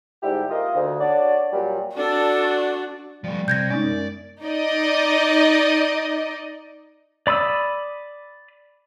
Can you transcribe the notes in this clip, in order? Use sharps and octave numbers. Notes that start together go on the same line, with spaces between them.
G#2 D3 G3 E4 G4
A#3 F4 D#5
D2
D4 F#4 C#5 D5
A#2 F#3 G3
D4 F#4 A4 D5
F3 G3 A3
C3 G6 G#6 A#6
G#3 B3 C#4 D#4 D5
F#2
D#4 D5 D#5
D5 B5 D#6 E6